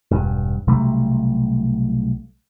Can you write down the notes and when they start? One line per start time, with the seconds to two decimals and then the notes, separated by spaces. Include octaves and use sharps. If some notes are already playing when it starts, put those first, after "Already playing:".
0.11 E1 G2
0.67 B1 C3 G3 A3